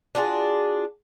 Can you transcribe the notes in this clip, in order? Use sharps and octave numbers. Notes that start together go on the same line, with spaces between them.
D4 F4 F#4 G#4